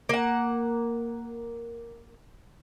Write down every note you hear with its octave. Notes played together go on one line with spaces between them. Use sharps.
A#3 F#5